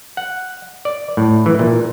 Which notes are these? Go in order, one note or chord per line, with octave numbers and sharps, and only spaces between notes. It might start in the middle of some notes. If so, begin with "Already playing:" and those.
F#5
D5
A2
E3
A#2